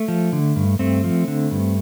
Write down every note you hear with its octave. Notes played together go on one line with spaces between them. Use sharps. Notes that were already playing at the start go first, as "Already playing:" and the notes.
Already playing: A3
F3
D3
G2
G2 A3 C4
F3
D3
G2